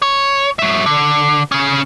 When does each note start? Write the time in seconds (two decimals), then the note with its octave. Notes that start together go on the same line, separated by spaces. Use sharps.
0.02 C#5
0.59 F#3 E5
0.86 D3
1.52 C#3 C#4